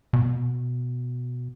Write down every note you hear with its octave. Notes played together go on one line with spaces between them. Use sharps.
B2